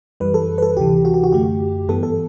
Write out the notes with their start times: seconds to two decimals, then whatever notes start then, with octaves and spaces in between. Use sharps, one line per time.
0.20 F#2 E3 G3 B4
0.34 A4
0.58 B4
0.62 A4
0.77 D2 C3 E3 G4
1.05 F#4
1.14 G4
1.24 F#4
1.32 F#2 D3 A3 G4
1.88 G2 E3 B3 A4
2.03 A4